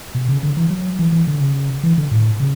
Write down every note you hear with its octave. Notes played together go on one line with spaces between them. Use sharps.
B2
C#3
D3
E3
F#3
E3
E3
D3
C#3
E3
D3
A2
C#3